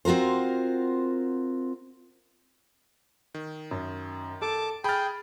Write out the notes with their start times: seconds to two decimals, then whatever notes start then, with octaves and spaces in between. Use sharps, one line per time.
0.05 C4 F4 F#4 A#4 C5
3.34 D#3
3.71 F#2
4.42 A4 A5 D6
4.84 G#4 G5 B5 F6 A6